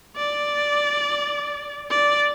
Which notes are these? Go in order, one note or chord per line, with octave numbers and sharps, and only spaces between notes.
D5
D5